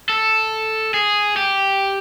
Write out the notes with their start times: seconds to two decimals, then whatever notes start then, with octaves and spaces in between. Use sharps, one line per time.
0.09 A4
0.94 G#4
1.37 G4